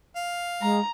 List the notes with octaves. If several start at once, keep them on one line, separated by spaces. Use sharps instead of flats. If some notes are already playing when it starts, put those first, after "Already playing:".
F5
G#3 A#5